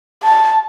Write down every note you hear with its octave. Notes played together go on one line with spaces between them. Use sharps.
A5